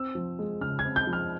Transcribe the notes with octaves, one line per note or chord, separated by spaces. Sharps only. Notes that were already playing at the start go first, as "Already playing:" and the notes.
Already playing: C4 E6
F3
G#3
C#3 F6
G#6
C4
G6
F3
F6